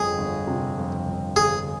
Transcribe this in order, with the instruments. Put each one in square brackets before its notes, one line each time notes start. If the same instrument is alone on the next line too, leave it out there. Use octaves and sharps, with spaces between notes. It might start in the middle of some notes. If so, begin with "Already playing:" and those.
Already playing: [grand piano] G1 F2 [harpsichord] G#4
[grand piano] G1
C3
F2
G1
[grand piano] G1 [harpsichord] G#4